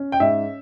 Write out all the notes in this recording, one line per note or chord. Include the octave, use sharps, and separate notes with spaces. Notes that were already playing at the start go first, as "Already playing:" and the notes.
Already playing: C#4
G5
G#2 E5